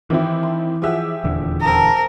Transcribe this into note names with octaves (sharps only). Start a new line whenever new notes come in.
D#3 E3 C4 E4 G4
C6
F3 G4 G#4 D#5 E5 F#5
D#1 E2 D3
C4 A#4 A5 D#6